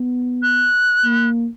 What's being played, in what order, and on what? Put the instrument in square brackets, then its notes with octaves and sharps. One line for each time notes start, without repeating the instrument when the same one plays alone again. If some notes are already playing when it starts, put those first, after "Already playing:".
Already playing: [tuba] B3
[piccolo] F#6
[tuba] A#3